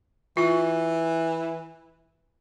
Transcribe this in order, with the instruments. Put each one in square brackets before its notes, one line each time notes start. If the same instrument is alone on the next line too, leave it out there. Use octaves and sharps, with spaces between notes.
[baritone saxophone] E3 [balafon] F4